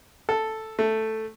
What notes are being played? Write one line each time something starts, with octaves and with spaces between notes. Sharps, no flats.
A4
A3